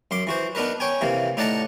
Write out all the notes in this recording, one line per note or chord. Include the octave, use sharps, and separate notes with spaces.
F#2 C6 D6
E3 F#4 C5
B3 D4 D#4 A#4 B4
C#5 G5 G#5
C3 E3 A#3
A2 D#4 D5 F#5 A5 A#5